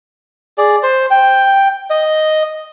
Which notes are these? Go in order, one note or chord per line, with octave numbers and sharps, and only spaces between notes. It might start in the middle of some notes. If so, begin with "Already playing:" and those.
G#4 D5
C5
G5
D#5